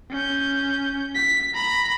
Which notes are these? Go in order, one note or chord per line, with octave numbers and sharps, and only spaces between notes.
C#4 G6
B6
A#5 B5